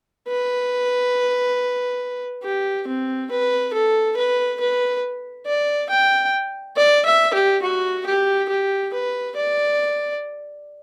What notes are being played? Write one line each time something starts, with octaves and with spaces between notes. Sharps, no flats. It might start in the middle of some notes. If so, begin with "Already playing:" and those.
B4
G4
C4
B4
A4
B4
B4
D5
G5
D5
E5
G4
F#4
G4
G4
B4
D5